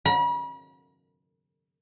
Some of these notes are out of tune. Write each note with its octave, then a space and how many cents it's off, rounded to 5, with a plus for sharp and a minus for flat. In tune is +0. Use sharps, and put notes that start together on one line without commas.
B5 -40